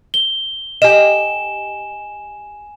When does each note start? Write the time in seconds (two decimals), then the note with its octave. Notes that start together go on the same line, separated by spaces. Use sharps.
0.14 G7
0.82 G4 D#5 G#5 E7